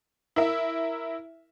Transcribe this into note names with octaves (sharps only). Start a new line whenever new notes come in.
E4 A#4 E5